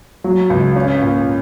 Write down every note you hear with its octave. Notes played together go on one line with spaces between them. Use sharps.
F#3
C#2
C#4
A#2